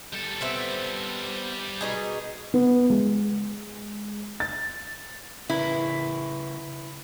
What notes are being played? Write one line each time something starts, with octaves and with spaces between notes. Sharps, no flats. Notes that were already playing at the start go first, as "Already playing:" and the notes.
G3 A4
B3 C4 E5
B2 D#4 G#4
B3
G#3
A6
C#3 E4 A#4 B4